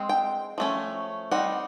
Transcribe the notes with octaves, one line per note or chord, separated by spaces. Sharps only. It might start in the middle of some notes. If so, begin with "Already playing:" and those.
Already playing: G#3 C4
G5
F3 A3 C#4
G3 C4 D#4 F#5